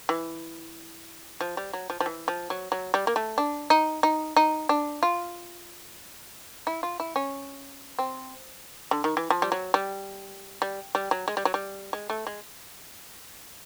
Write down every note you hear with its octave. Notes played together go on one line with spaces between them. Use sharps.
E3
F3
G3
F#3
F3
F3
E3
F3
F#3
F#3
G3
A#3
A3
D4
D#4
D#4
D#4
D4
F4
E4
F4
E4
C#4
C4
D3
D#3
E3
F3
G3
F#3
G3
G3
G3
F#3
G#3
G3
F#3
G3
G#3
A3
G#3